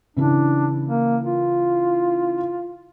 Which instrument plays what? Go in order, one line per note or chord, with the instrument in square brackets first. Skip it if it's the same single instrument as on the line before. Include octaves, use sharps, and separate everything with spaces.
[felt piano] C#3 E3 E4 [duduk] D4
[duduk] A#3
F4